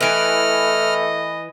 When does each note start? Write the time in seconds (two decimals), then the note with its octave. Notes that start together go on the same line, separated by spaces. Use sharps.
0.01 E3 A3 B4 D#5 F6